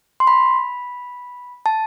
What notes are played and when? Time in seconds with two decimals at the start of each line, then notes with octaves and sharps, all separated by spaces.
0.20 C6
0.27 B5
1.66 A5